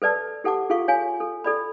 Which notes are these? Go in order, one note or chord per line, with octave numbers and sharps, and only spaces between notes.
A4 B4 D5 A5 E6
G4 A4 F#5 A5 D6
F4 G#4 A4 F5 C#6
C#5 F5 G#5
A4
A4 D5 B5